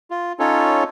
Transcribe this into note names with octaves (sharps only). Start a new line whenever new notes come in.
F4
C#4 D#4 F4 A4 C#5